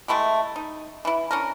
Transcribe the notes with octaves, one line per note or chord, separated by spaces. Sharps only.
G#3 A3 E4 G4
D#4
E3 E4
C#4 D4 A#4